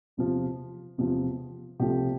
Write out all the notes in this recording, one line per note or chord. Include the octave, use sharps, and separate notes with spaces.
E2 C3 F3
E2 C3 F3
C2 C3 F3 A3 G4